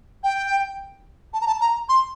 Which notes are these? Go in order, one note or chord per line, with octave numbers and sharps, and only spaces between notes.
G5
A5
A#5
A5
A#5
C6